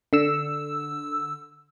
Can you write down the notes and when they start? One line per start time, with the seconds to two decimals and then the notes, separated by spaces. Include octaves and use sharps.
0.13 D3 E6